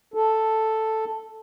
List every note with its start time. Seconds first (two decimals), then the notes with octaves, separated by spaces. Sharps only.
0.14 A4